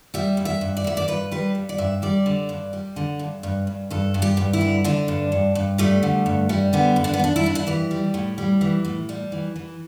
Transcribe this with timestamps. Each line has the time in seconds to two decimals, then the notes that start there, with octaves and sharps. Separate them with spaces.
0.14 G3 E5
0.37 G2
0.45 E5
0.61 G2
0.77 D5
0.84 G2 E5
0.97 D5
1.08 G2 B4
1.31 G3 B4
1.55 G2
1.69 D5
1.78 G2 E5
2.02 G3 D5
2.26 D3
2.49 G2
2.73 G3
2.96 D3
3.19 G2
3.43 G2
3.67 G2
3.90 G2 A4
4.14 G2
4.22 G4
4.37 G2
4.53 E4
4.61 D3
4.84 D3 D4
5.08 G2
5.32 G2
5.55 G2
5.78 G3 A3
6.03 D3
6.26 G2
6.49 G3
6.73 D3 B3
6.96 G2
7.04 D4
7.14 B3
7.19 G2 D4
7.36 E4
7.44 G2 D4
7.55 E4
7.67 E3 G4
7.91 G3
8.14 A2
8.38 G3
8.61 E3
8.85 A2
9.09 G3
9.32 E3
9.56 E3